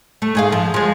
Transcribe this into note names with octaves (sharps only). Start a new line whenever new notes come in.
A3
G#2 G#4 F5
F3
F3 G#3